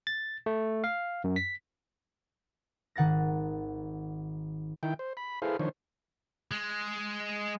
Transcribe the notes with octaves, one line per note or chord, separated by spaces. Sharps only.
A6
A3
F5
F#2
B6
G#1 D#3 F#5 A6 A#6
D#3 E4 G5
C5
B5
E4 G#4 A4 B4 C5 F5
D#3 F3 D4 C5 C#5
G#3